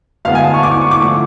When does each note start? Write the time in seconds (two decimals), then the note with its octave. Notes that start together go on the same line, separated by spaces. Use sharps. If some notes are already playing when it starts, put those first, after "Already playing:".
0.25 D2 D3 G#3 B3 F5
0.35 G#5
0.44 A5
0.54 C#6
0.63 D6
0.72 C#6
0.82 C#6
0.91 D6
1.00 D3 F3 A3 C#6